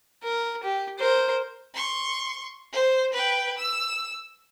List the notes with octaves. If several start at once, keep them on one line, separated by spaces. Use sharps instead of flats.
A#4
G4
A#4 C5
C6 C#6
C5
B4 G5
E6